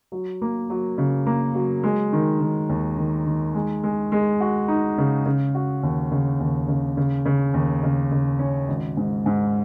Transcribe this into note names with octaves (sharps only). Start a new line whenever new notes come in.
F#3
A#3
F#3
C#3
A#3
F#3
G#3
D#3
D#3
D#2
D#3
D#3
G#3
G#3
G#3
F#4
D#4
C#3
C#3
F#4
D#2
C#3
D#2
C#3
C#3
C#3
D#2
C#3
C#3
C#4
G#1
G#2
G#2